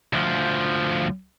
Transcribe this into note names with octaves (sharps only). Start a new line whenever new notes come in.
D2 F3